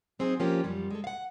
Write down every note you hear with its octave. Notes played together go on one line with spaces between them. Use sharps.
F#3 C4 D#4 G#4
F3 A#3 C#4 G4
F#2 F3 G3
G#3 A4
F5 F#5